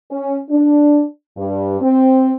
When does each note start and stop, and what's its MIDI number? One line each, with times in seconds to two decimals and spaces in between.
0.11 0.38 61
0.51 1.04 62
1.37 1.79 43
1.81 2.34 60